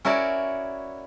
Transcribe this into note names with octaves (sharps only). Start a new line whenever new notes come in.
C#4 E4 F#4 A#4 D5